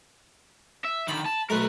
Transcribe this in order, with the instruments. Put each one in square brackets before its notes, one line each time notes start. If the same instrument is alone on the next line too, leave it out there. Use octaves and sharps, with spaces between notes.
[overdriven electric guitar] E5
[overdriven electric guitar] D3 D#3 [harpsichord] B5
[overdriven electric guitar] A5
[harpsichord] B1 A3 [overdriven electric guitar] A#4 B4